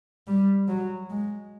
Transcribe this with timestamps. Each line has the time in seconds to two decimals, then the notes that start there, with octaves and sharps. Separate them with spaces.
0.27 G3
0.68 F#3
1.10 G#3